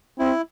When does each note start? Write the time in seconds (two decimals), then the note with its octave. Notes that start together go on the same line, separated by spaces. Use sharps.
0.19 C4 E4